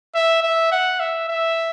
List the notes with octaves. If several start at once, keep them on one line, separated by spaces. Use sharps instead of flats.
E5
E5
F#5
E5
E5